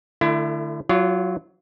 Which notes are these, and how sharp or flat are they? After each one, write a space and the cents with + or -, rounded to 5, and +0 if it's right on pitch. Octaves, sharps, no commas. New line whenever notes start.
D3 +35 A3 +0 E4 +30
F#3 +0 F4 -20 C#5 +40